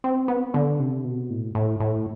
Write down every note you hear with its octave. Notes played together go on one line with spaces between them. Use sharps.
C4
B3
D3
C3
B2
A2
A2
A2